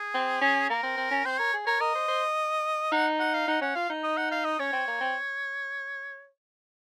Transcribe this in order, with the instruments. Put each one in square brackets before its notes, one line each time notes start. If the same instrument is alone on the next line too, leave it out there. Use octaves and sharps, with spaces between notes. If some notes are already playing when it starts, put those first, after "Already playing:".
Already playing: [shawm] G#4
[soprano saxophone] C4
C#4
[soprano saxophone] A#3 [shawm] A#4
[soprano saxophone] C4
C4
C#4
[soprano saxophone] C4 [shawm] C5
[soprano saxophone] A#4 [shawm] C#5
[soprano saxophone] G#4
[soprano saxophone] A#4 [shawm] C#5
[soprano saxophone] A#4 [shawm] D#5
[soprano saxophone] C5
C5
[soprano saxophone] D#4 [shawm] F#5
[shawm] F#5
F5
[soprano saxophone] D#4 [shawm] F#5
[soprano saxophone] C#4 [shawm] F#5
[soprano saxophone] F4 [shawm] F5
[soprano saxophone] D#4
[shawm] D#5
F#5
F5
D#5
[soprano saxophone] C#4 [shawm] C#5
[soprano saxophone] C4
A#3
C4